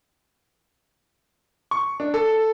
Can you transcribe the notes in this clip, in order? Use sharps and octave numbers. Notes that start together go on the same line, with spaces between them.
C#6
D4
A4